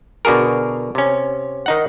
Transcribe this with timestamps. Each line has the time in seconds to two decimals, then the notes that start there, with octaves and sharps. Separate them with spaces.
0.25 B2 D3 F#4 G#4 A#4
0.95 C3 C#4
1.66 D#3 D#4 F#5